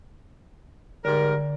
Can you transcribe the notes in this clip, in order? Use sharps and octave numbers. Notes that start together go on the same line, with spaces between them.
G#2 D3 G3 A#4